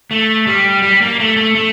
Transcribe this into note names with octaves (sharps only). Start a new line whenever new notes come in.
A3
G3
G3
A#3
A3
A3
A3